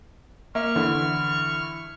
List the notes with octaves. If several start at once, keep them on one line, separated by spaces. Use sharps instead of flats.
A#3 E5 C#6 F6
E2 D3 E4